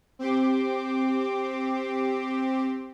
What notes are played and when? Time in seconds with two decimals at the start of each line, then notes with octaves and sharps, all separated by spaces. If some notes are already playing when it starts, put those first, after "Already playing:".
0.19 C4 G4 C6 D6